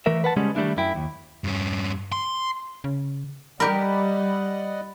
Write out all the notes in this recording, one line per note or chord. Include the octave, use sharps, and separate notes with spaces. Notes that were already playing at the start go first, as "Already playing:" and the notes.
E3 A3 A#4 E5
B4 F#5 A5
C#3 G3 G#3 C#4
D#3 G3 A3 D4 E4
F#2 E4 G5
D#2
G2 C#4
C6
C#3
G3 G4 A#4 D5 D#5 F#5 B5